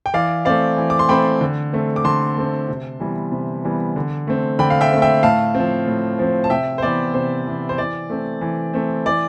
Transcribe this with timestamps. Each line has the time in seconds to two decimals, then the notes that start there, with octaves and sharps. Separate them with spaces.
0.06 G5
0.14 E3 D5 F5
0.45 A3 C4 D5 F5
0.77 E3
0.90 D6
0.99 C6
1.09 A3 C4 G5 B5
1.41 D3
1.73 A3 C4
1.96 D6
2.04 D3 A5 C6
2.37 A3 C4
2.68 C3
3.00 E3 G3 B3
3.32 C3
3.64 E3 G3 B3
3.96 D3
4.27 A3 C4
4.59 D3 G5 B5
4.70 F5
4.81 E5 G5
4.91 A3 C4
5.02 E5 G5
5.23 A2 F5 A5
5.55 F3 C4
5.88 A2
6.19 F3 C4
6.44 A5
6.50 C3 E5 G5
6.78 C5
6.82 E3 B3 D5
7.14 C3 C5
7.46 E3 B3
7.69 C5
7.78 E3 D5
8.10 A3 C4
8.41 E3
8.74 A3 C4
9.06 E3 D5